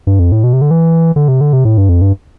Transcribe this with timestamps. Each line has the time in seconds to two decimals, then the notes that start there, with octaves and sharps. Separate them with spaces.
0.07 G2
0.19 F2
0.32 A2
0.44 B2
0.53 C3
0.62 D3
0.71 E3
1.16 D3
1.28 C3
1.41 D3
1.53 C3
1.65 A2
1.78 G2
1.89 F2
2.02 G2